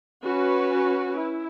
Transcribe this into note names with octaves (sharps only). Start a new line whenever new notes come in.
C#4 F#4 B4
E4